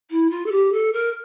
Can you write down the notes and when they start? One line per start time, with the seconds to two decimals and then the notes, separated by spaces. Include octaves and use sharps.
0.10 E4
0.30 F4
0.46 A4
0.52 G4
0.72 A4
0.93 A#4